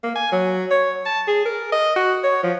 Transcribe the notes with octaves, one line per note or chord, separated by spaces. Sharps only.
A#3
G#5
F#3
C#5
A5
G#4
A#4
D#5
F#4
C#5
F3